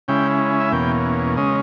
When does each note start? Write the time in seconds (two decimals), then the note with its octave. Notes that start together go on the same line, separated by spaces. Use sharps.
0.08 C#3 G#3 C#4 E4 G5
0.60 E5
0.72 E2 B2 A#3 C#4 G5
1.37 C#3 G#3 C#4 D#5